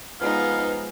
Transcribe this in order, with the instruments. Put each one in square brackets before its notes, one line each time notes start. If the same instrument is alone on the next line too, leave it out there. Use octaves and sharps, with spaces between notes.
[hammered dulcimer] F3 G#3 [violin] B3 D#4 [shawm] F5